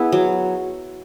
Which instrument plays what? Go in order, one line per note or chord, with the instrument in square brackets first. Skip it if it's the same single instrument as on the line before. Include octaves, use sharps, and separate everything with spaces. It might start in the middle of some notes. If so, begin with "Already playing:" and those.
Already playing: [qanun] B3 E4 G#4
F#3